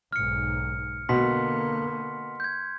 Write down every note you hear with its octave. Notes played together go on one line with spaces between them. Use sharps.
B1 G#2 F6 C#7
B2 D3 A#3 C6 B6
G6 G#6